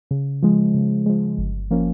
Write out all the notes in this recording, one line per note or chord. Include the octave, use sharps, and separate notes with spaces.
C#3
F3 G#3
C#3
F3 G#3
G1
F3 A#3 C#4